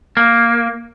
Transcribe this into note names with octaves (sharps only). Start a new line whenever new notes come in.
A#3